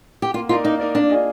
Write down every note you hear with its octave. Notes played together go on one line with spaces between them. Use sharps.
G4
A#3 F4
D#4 F4 A#4 D5
A#3 D#4
D#4 A#4 D5
A#3 D4
F4 G#4 D#5